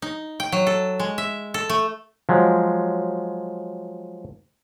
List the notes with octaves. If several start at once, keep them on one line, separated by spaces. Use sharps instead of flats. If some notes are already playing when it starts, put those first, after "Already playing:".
D#4
G5
F#3
A4
G#3
E5
A4
A3
F3 F#3 G#3